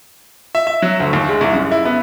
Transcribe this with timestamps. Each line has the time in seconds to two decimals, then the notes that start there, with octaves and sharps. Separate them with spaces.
0.55 E5
0.67 E5
0.82 F#3
1.00 D2
1.13 D#2
1.29 G#3
1.41 C2
1.53 F#2
1.72 E4
1.85 B3